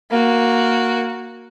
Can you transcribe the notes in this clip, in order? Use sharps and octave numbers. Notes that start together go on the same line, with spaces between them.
A#3 F#4